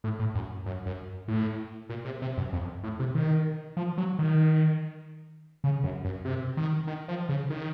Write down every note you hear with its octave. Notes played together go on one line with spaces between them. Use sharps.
A2
A2
F#2
F#2
F#2
A2
A#2
C3
C3
F#2
F2
A2
C3
D#3
F3
F#3
D#3
C#3
F#2
F#2
C3
D#3
D#3
F3
C#3
D#3